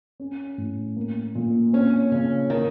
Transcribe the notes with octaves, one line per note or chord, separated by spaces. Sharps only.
C#4
A2
A#3
A#2
C4 C#4
C#3 C#4
D#3 A#3